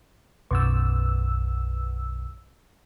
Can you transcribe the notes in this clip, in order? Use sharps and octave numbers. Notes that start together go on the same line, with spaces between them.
B1 F#2 E6